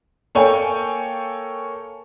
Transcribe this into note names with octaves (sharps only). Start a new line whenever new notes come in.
A#3 A4 C#5 G5 G#5